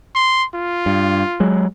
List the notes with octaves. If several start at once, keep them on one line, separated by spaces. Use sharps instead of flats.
C6
F4
G2
F#3 G#3